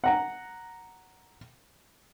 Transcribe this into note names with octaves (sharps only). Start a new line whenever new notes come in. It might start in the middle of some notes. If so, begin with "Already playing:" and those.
F#5 A#5